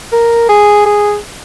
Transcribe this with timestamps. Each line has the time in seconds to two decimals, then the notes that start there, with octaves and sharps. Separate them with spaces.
0.13 A#4
0.49 G#4
0.86 G#4